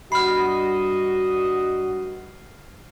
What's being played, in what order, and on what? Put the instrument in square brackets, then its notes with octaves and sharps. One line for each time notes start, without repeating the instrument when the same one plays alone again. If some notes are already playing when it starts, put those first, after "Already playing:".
[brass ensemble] G2 F#4 D#5 [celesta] B5 [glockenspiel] F6 C7